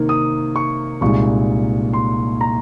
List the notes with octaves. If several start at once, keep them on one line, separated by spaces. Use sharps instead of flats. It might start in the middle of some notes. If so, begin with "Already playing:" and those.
Already playing: C3 D#3 A#3 D#4
D#6
C#6
C2 A#2 G#3 D#4 C#6
C6
A#5